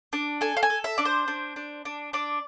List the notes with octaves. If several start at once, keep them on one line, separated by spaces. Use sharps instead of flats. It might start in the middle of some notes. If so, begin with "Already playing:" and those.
D4
A4 G#5
F5
G#5
A4
E5
D4 D5
C5
D4
D4
D4
D4 D5